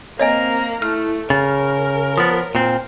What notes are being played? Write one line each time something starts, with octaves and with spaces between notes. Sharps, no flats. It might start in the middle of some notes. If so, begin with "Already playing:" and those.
A#3 C4 C#5 D#5 G#5 A#5
A3 E4 F6
C#3 A#4 C#5 A6
F3 B3 D#6 A6
A#2 C4